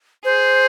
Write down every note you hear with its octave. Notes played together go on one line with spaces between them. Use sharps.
G#4 C5